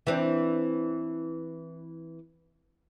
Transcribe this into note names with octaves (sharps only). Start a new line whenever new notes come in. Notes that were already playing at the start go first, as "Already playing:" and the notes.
E3 C4 D4